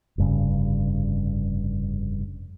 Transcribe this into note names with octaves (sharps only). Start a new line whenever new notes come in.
F1 G2 C#3